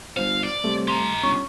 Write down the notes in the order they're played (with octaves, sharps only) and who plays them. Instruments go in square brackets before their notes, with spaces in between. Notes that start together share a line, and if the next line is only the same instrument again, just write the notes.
[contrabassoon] G1 [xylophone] C5 [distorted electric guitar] F5
[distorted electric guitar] D5
[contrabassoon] C3 [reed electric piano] G3 A3
[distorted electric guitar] G4 A#5 [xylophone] C6
[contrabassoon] G1 [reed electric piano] C#4 [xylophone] C#6